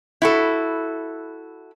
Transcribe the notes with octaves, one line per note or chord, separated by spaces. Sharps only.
E4 F#4 A4